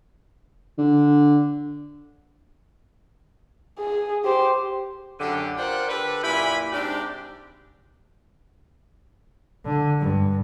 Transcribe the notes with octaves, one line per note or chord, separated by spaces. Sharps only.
D3
G#4
G4 C5
F#2 D3 G4
F4 A#4 C5 D5 F#5 G5
D3 G4 A4 B4
F#2 A#2 E4 G4 G#5 B5
G#2 C3 D4 G4
D3
G2